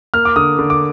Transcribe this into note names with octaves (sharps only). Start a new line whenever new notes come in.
A#3 F6
D6
D3 D#6
D3
D6